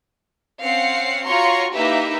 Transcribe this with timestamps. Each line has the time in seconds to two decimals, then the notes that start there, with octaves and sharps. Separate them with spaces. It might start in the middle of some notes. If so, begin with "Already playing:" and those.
0.64 C4 C#4 F5 F#5 C7 C#7
1.26 F4 F#4 C#5 A#5 C6 C#6
1.76 A#3 D#4 E4 G4 B4 E5